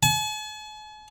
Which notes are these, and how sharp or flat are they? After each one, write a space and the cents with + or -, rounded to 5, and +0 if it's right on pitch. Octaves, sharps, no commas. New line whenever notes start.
G#5 +45